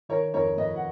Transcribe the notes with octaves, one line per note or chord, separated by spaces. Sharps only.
D#3 A#4 C#5
F2 A#4 C#5
F2 B4 D#5
F#5